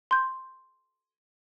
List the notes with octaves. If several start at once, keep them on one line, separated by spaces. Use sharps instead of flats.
C6 G6